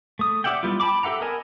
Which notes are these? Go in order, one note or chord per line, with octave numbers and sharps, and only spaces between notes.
A3 D#6
G4 D5 E5 F#5 G5
G3 B3 E4 F4
G5 A5 B5 D6
G4 A4 E5 F#5 A#5
B3 A#4 D#5 G#5 A5